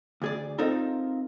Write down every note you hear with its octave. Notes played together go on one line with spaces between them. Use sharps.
D2 G#4 D5
C4 D#4 F4 A4 A#4